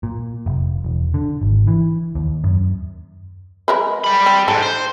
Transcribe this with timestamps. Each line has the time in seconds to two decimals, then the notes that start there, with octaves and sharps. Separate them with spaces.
0.03 A#2
0.46 F1
0.84 E1
1.14 D3
1.41 G#1
1.67 E3
2.15 D#2
2.44 F#2
3.68 G#3 A#4 B4
4.04 G3 B5
4.26 C4
4.48 G#2 A4
4.63 C5